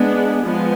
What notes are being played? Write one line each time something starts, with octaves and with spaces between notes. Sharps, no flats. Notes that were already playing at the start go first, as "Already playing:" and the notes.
Already playing: G#3 B3 D4
F3 G#3 B3